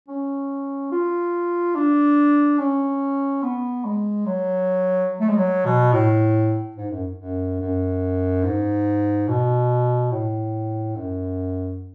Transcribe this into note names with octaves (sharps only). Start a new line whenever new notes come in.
C#4
F4
D4
C#4
B3
G#3
F#3
A3
G#3
F#3
B2
A2
G#2
F#2
F#2
F#2
G#2
B2
A2
F#2